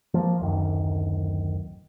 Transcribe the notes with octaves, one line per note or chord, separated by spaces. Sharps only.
F3 A3 A#3
D1 F#2 D#3